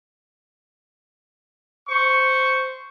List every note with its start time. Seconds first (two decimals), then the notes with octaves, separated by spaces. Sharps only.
1.88 C5 C#6